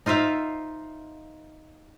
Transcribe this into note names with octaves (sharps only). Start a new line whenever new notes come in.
D#4 F4 C5 E5 F5